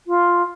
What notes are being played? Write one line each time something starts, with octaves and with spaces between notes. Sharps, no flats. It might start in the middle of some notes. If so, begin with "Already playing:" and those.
F4